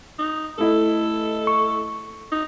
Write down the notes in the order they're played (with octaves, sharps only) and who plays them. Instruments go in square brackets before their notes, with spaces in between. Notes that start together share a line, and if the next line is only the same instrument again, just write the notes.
[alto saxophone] D#4
[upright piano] A3 E4 D#5 [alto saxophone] A4
[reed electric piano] C#6
[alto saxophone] D#4